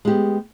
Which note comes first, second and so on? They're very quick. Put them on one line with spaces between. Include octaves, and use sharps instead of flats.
G#3 G4 B3